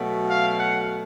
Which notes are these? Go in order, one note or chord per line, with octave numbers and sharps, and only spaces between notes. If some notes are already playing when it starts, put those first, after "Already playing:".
Already playing: B2 F#3 A3
F5
F#5